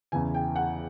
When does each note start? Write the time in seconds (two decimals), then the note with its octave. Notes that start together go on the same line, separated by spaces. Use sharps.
0.12 E2 C#3 E3 G#5
0.34 G5
0.56 F#5